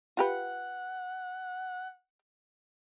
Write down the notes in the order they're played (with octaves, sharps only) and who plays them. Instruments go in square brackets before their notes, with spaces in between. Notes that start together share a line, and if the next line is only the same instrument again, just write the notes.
[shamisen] F4 G4 B4 [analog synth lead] F#5